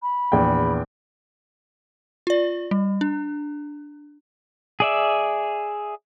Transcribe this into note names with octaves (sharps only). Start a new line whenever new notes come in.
B5
A#1 E2 G5
F4 D5
G3
D4
G#4 D5 E5